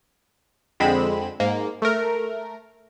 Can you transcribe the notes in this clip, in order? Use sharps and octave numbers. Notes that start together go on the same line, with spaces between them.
F2 D3 G#3 C4 B5 E7
G#2 A#3
A3 A#4